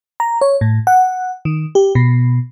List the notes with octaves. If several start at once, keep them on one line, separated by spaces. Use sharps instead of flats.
A#5
C#5
A2
F#5
D#3
G4
B2